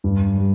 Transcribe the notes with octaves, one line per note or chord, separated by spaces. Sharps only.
G2
G3